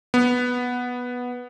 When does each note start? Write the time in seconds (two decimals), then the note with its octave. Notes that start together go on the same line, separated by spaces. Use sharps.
0.14 B3